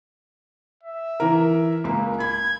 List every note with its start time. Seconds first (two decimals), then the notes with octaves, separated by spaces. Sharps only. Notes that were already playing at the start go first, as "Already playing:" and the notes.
0.83 E5
1.20 E3 A#4
1.84 C#2 A#3
2.20 B5 G#6